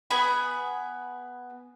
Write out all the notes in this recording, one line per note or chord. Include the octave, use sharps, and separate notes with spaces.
B3 G#4 B5